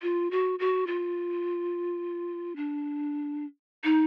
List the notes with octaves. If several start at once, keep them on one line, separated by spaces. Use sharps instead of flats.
F4
F#4
F#4
F4
D4
D#4